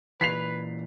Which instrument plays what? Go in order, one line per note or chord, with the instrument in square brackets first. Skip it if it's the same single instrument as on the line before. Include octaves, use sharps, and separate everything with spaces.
[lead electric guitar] A#2 E3 [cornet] B4 [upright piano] B6 C7 F7